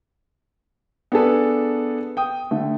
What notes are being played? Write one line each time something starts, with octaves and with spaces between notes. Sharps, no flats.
B3 D4 G#4 A4 B4
G5 D#6
D3 A3